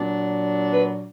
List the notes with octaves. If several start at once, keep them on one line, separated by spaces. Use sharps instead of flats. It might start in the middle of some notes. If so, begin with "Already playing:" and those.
Already playing: A#2 F#3 D4
B4